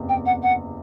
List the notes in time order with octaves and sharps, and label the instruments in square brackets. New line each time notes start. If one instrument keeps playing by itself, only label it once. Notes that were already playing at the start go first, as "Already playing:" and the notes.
Already playing: [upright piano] F#1 E2 C3
[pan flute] G5
F#5
F#5